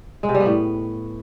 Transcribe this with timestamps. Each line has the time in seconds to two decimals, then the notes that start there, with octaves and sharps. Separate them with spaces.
0.23 G#3
0.29 C3
0.34 G3
0.40 B3
0.46 A2